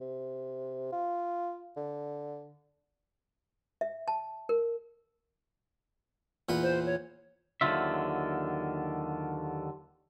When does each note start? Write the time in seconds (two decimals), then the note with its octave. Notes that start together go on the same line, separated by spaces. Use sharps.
0.01 C3
0.92 F4
1.77 D3
3.81 E5
4.08 A5
4.49 A#4
6.49 E2 A#2 B4
6.63 C5
6.86 C#5
7.61 D#2 D3 F3 F#3 F4 E5